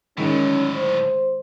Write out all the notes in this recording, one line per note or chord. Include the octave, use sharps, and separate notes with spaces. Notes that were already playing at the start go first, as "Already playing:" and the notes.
A2 D3 D#3 G#3 C#4
C5